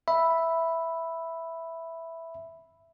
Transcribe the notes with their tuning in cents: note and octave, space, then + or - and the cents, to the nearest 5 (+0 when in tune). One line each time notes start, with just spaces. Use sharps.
E5 +0 B5 +0